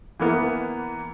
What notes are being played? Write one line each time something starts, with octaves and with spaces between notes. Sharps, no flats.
E3 A#3 B3 E4